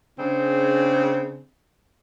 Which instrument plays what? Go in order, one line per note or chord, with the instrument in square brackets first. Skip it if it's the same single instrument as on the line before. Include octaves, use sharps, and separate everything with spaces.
[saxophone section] C#3 C4 D4 G#4